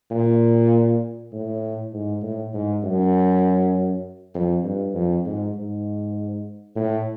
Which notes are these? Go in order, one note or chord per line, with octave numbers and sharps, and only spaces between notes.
A#2
A2
G#2
A2
G#2
F#2
F2
G2
F2
G#2
G#2
A2